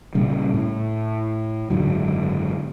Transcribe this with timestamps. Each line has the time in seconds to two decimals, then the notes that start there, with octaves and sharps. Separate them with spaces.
0.15 A#2 C#3 G3
0.54 A2
1.70 F#1 G#2 D3 F#3